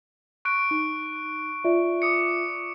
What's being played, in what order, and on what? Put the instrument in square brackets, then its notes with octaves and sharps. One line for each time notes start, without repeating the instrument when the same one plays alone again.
[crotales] C#6 F#6 D7
[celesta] D#4
F4 D5 E5
[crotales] D6 D#6 C#7